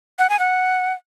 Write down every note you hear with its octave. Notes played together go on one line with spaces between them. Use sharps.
F#5
G#5
F#5